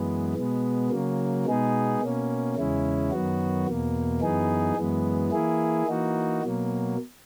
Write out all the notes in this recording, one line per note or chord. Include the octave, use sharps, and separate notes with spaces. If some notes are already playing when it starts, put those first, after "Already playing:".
Already playing: F#2 E3 G#3 B3
B2 G#3 B3
C#3 F#3 A#3
B2 G#3 B3 D#4 G#4
B2 A#3 C#4
E2 C#3 G#3 C#4 E4
F#2 D#3 F#3 B3 F#4
E2 B2 A#3
F#2 E3 B3 D#4 G#4
F#2 E3 G#3 B3
E3 A#3 E4 G#4
E3 A#3 D#4 F#4
B2 F#3 A#3